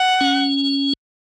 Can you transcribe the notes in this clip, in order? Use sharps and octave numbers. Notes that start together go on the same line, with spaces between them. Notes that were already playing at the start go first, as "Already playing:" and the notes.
Already playing: F#5
C#4